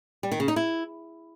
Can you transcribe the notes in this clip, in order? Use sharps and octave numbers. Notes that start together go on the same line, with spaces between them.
G3
D#3
C#3
D#4
E4